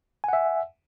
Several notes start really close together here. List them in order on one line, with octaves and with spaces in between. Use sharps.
G#5 F#5 E5